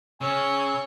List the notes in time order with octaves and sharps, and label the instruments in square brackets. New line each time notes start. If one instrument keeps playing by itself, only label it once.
[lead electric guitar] C#3 [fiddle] C#5 [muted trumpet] G#5 [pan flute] E6